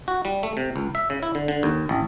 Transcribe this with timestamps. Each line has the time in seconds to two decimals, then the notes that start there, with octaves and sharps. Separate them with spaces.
0.08 F#4
0.25 G3
0.43 A3
0.57 C3
0.76 C#2
0.95 E5
1.10 C#3
1.23 E4
1.35 D3
1.48 D3
1.63 D#2
1.89 A1